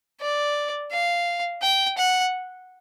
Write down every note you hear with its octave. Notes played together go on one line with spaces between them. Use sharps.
D5
F5
G5
F#5